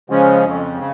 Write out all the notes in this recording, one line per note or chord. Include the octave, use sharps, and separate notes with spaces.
C#3 F3 G#3 C#4
F2
C#3